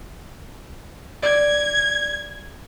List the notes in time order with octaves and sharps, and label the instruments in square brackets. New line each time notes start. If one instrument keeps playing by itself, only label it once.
[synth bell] D5 [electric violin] G#6